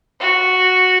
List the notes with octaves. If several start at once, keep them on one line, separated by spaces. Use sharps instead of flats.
F#4